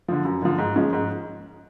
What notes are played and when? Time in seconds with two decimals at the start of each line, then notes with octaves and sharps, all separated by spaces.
0.08 D3 F3
0.25 F#2
0.42 D3 F3
0.58 G#2
0.76 F3 G#3 C#4
0.93 G#2